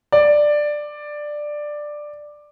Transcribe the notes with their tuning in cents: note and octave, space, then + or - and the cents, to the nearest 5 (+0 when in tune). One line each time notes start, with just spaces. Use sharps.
D5 +10